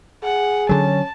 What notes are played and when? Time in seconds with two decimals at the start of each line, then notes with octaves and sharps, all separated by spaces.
0.23 G#4 F#5
0.69 D3 F#3 C#4 A5